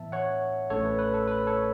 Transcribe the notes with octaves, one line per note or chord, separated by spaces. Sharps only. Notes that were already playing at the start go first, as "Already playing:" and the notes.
Already playing: A2 E3 B3 E5 A5
C#5 F#5
A1 A2 A3 C#4 A4 C#5
B4
B4
A4
B4
A4 C#5